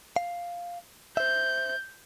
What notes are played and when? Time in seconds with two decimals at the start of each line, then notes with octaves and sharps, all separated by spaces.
0.16 F5
1.17 C5 E5 G6